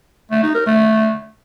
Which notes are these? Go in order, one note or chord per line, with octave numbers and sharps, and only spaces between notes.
A3
D#4
A#4
A3